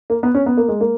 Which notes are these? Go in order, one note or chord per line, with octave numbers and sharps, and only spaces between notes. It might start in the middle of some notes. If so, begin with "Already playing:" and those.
A#3
B3
C#4
B3
A#3
G#3
A#3